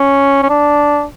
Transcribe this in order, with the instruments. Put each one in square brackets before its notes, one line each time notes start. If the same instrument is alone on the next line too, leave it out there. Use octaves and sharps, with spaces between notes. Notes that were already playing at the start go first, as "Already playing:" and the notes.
Already playing: [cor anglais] C#4
C#4
D4